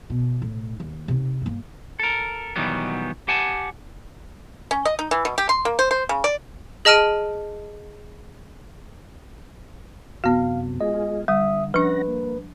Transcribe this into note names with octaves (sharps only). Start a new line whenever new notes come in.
B2
A2
D#2
C3 D#4
G2 A#3
A4 A#4
B2 D#3 E3 F#3 G3 B3
G4 F#5 G#5 A5
C#4
D#5
D#4
E3
B2
G4
C6
A#3
C5
C5
C#3
D5
G#4 D#5 A5 F6 D7 D#7
F#2 C3 B3 F#4 F5
G#3 F4 G#4 D#5
D3 G3 E5 D#6
F3 C#4 D4 B4 F#5 A#6
A#3